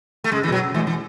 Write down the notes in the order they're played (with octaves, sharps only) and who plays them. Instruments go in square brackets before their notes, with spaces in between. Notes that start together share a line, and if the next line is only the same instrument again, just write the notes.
[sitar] A3
[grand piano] C#3 [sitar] G#3
[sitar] E3
[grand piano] B2
[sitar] F#3
[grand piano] C#3
[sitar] E3 [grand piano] A3
[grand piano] G#3
[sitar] E3